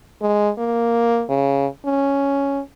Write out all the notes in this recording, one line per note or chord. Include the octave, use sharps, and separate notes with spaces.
G#3
A#3
C#3
C#4